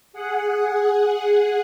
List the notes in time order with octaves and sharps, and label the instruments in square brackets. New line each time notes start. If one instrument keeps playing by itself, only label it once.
[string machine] G#4 F#5